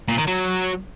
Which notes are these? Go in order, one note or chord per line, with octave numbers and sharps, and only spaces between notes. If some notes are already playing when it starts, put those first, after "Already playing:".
A#2
D#3
F#3